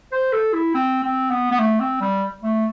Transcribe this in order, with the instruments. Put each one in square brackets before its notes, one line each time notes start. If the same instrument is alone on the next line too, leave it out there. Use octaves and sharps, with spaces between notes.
[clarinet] C5
A4
E4
C4
C4
B3
B3
A3
C4
G3
A3